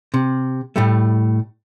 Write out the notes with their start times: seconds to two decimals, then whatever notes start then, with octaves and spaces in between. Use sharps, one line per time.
0.14 C3
0.76 A2 G3 A3